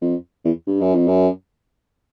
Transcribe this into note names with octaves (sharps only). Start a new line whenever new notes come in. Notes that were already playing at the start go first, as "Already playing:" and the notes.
F2
E2
G2
F#2
F2
F#2